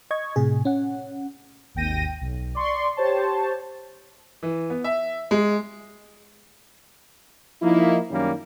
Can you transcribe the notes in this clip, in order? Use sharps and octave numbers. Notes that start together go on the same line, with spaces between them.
D#5 C#6 G#6
A2 C3 G#4
C#4 F#5
G#1 D#2 G5 A#6 D#7
B1
D5 C6 C#6
G4 C5 C#5 A5
E3
B3
E5
G#3
F3 A#3 D#4 E4
F#2 D#3 G3 A#3 C#4